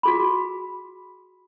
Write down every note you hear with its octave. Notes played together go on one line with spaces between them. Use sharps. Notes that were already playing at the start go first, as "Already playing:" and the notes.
F#4 G#4 B5